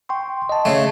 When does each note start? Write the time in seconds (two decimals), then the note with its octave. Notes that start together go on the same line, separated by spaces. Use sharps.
0.09 G5 C6 C#6
0.49 D#5 A5
0.65 C#3 A3